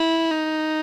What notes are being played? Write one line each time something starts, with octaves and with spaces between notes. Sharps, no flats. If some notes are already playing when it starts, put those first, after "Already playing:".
Already playing: E4
D#4